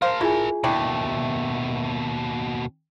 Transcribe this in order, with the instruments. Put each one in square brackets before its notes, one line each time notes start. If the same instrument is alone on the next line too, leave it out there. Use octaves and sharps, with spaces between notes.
[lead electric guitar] A#4 A5 [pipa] C5 F5
[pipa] E4 [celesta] F4 G#4 G#5
[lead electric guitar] D#2 B2 [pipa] A3 D4 E4 [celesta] G5